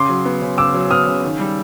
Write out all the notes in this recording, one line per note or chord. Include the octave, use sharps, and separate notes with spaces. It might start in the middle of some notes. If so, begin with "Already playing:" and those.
Already playing: C#3 C6 D6
F#3
B3
C#3
C#3 D6 E6
F#3
B3 D#6 F6
C#3
D#3
G3